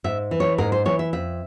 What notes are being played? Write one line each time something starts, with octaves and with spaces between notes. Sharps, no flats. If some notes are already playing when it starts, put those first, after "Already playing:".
G#2 E5
E3
C#5
G#2 A#4
C5
E3 C#5
E5
F2 E5